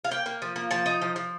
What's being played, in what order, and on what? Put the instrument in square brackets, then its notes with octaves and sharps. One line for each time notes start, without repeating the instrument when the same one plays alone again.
[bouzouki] F5
A#3 G5
A#3
F3
A#3
F3 A5
D#4
F3
F3